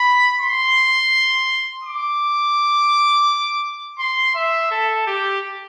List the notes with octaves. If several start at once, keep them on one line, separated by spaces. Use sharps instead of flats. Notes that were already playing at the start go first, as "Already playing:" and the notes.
Already playing: B5
C6
D6
C6
E5
A4
G4